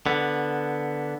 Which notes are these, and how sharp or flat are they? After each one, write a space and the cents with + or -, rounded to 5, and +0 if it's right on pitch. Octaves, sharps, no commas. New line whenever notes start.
D3 +0 B3 +0